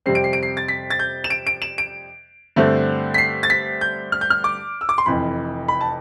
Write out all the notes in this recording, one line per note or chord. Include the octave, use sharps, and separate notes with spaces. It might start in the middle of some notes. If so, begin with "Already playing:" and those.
F2 C3 G3 C4 C7
D7
C7
D7
C7
A6
B6
A6
G6
E7
D7
D7
E7
D7
G2 D3 A3 C4
B6
C7
A6
B6
G6
F6
G6
F6
D6
E6
D6
C6
F1 F2 E3 B5
B5
A5